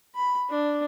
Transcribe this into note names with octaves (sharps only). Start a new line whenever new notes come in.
B5
D4